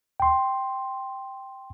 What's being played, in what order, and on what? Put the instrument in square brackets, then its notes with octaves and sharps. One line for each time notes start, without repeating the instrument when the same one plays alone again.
[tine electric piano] G5 C6